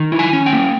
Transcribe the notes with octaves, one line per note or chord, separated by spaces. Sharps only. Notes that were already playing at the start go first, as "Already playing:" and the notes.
Already playing: D#3
E4
G#5
C#4
G5
A#3